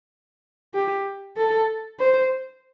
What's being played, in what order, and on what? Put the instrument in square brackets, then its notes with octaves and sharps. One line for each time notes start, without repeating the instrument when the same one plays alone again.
[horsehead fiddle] G4
A4
C5